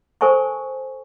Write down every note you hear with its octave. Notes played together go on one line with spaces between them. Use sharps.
A4 A#4 C5 G#5 A5 C#6